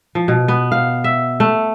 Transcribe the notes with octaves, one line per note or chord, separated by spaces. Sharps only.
F3
B2
B3
F5
E5
A3